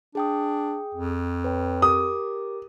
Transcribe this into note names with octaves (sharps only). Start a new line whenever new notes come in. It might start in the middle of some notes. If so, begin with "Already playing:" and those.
D4 G#4 G5 D#6
F2
B4 C#5 G5
G4 A#4 D6 D#6